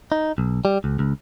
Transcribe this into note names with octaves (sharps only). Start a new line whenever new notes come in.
D#4
B1
G3
C#2
C#2